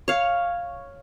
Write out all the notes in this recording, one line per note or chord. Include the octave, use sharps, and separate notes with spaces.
C#5 F5